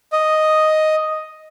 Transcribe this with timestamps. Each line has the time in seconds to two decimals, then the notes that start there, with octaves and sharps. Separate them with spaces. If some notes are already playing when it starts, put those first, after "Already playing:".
0.12 D#5